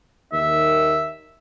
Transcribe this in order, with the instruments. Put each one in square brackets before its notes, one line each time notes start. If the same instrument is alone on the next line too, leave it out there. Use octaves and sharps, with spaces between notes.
[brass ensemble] D#2 D#3 [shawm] E5